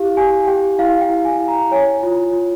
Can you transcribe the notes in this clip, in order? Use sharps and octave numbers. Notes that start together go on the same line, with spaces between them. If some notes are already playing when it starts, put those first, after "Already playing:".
Already playing: E4 G4 F5
G4 G#5
G4 G5
E4 F5
G5
E4
G#5
E4
A#5
C#5 G#5
F4
F4